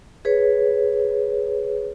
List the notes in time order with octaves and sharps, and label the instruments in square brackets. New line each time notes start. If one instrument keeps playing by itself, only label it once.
[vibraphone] G#4 B4 C#5